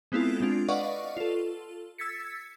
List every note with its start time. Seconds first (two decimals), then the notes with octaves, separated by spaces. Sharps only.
0.12 G#3 B3 C4 E4 F4 A4
0.41 G#3 C4 D4 F4
0.68 B4 D5 D#5 F5 F#5 C#6
1.17 F4 A4
1.98 E6 G#6 A6 B6 C#7